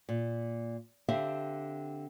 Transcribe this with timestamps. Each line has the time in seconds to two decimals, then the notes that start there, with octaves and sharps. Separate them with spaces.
0.09 A#2
1.08 D3 C4 G4 E5 F5